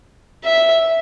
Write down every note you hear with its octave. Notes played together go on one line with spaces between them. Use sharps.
E5